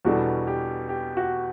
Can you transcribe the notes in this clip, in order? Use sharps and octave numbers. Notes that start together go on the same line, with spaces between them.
E2 B2 G3 D4 F#4 A4
G4
G4
F#4